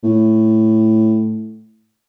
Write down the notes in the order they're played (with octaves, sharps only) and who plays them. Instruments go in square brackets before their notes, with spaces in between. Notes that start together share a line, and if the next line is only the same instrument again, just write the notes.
[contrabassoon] A2